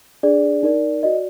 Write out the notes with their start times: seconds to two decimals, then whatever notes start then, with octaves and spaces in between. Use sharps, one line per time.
0.23 D4 G#4 D5
0.63 D#4 A#4 D5
1.03 F#4 D5 D#5